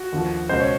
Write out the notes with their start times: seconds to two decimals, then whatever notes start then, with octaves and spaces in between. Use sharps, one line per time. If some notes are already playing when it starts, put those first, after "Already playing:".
Already playing: F#4
0.12 D#2 D3 F3
0.49 C#2 B2 C5
0.60 C#5